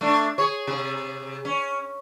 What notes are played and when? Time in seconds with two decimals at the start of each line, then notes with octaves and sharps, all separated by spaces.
0.01 A3 D4
0.38 G#4 C#5
0.67 C3 G#4
1.45 C#4